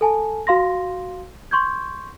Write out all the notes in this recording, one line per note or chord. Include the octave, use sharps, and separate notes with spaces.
A4 G#5 A5
F#4 F5 C6 A#6
C6 C#6 G6 G#6